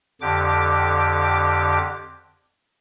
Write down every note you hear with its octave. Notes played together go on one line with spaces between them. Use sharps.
F2 D3 G4 D6